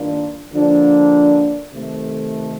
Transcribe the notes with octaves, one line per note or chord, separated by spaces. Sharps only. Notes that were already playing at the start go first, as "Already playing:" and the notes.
Already playing: G2 D#3 A#3 D4 F4
D3 F3 A#3 D4
C3 D#3 A3